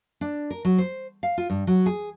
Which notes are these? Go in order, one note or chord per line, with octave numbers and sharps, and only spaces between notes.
D4
A#4
F#3
C5
F5
F4
G2
F#3
G#4